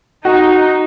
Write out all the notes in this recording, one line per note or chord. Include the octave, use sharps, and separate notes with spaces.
D#4 F#4